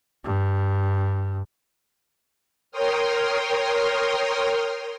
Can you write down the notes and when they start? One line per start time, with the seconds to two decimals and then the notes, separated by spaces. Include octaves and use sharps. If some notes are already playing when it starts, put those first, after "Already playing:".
0.25 G2
2.71 A#4 C#5 G5 C6 D#6 F6